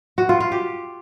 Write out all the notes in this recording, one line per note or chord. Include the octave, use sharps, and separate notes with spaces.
F#4
F4
F4
G4